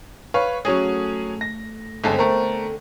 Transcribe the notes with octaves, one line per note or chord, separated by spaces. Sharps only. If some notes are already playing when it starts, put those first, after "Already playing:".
B4 C#5 F5
F#3 A3 C#4 F#4 G#4
A#6
G1 D3 G#3 B3 C4 A4
A3 A#4